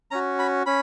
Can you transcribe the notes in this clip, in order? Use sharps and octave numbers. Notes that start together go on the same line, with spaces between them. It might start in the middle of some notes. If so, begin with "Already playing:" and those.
C#4 F#4 A#5
B5
C#4 B5